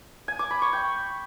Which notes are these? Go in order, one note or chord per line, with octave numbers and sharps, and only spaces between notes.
G#5
D6
B5
C#6
G5